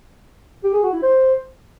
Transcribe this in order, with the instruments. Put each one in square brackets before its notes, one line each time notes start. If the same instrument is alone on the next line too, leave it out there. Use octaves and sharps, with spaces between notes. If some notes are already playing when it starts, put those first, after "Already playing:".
[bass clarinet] G4
G#4
F#4
E4
C5